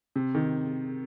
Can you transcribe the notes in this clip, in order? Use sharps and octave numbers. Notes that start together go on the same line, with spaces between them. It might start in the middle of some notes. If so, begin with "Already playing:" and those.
C3
D#3